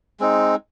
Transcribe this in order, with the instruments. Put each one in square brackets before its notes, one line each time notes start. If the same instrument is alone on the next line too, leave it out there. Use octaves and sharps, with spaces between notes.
[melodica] G#3 C4 D#4